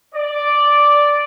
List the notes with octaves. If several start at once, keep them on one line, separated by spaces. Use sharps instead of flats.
D5